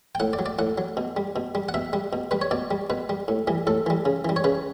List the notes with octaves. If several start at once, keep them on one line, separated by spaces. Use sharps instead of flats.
G5
A2 F#5
D5
F#3
D5
A2 F#5
F#3
B2
G3
B2
G3
F#5
B2 E5
G3
B2
G3 B4
C#5
B2 D5
G3
B2 B4
G3
A2
E3 G3
A2 A4
E3 G3
C#3
E3 G3
C#5
C#3 B4